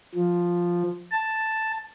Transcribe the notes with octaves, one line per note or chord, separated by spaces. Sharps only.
F3
A5